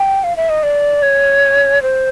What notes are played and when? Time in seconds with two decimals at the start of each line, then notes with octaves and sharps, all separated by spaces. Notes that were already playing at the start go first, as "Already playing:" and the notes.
Already playing: G5
0.24 F5
0.36 E5
0.50 D#5
0.63 D5
1.02 C#5
1.82 C5